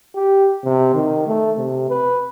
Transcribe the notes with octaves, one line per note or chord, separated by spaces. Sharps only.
G4
C3
D#3
A3
C3
B4